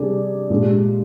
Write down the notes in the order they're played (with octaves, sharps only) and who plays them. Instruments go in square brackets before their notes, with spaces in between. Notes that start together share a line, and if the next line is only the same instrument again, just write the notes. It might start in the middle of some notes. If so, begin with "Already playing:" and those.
Already playing: [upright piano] C3 G3 D4 G#4 D5
A#2 G#3 D4 G4